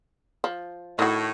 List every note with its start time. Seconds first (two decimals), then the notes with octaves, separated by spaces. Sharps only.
0.44 F3
0.99 A2 D#3 F#4